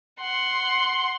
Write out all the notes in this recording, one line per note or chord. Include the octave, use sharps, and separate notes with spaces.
F#5 C6